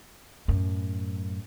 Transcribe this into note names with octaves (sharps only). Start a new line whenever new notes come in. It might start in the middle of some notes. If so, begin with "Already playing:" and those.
F#2 A2